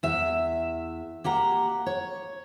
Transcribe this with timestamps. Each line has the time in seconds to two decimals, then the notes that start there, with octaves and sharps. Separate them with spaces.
0.03 E2 E5
1.24 A#3 G4 F#5 A#5
1.86 C#5